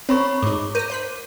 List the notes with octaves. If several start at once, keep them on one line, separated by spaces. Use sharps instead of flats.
C4 A#4 C#5 B5 C#6
G#2 D#4 D6
A#4 G6 A#6 D#7
C5 F#6 B6